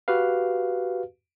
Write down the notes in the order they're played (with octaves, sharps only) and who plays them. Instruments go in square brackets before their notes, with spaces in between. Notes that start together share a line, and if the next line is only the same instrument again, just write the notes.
[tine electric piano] F#4 G4 B4 F5